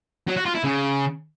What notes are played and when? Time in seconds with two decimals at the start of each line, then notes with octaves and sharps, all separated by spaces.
0.28 F#3
0.37 F#4
0.46 F4
0.55 E4
0.64 C#3